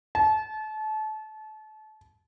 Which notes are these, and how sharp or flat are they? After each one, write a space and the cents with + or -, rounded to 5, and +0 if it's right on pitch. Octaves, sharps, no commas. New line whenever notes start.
A5 -30